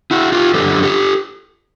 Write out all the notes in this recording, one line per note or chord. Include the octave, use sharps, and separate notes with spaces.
E4 F#4
F4 G4
F#2 D3 F3 G4 A4
G4 A4